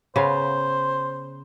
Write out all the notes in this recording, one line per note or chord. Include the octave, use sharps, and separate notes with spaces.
C#3 B3 C5 F5